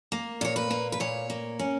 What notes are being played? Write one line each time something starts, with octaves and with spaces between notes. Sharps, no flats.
A#3
A#2 C#5
B4
A#3
B4
A#2 C#5
A#3
C#4